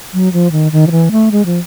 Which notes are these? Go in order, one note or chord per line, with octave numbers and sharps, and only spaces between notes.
F#3
F3
D#3
D#3
F3
E3
A3
G#3
F3